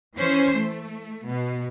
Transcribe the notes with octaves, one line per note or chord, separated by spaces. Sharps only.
E3 C#4 C5
A3
B2